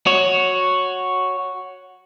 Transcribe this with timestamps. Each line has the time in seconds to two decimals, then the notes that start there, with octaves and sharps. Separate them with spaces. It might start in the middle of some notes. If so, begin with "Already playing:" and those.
0.06 F#4 C#5